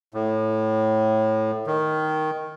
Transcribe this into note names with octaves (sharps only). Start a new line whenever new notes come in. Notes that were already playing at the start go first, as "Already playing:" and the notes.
A2
D#3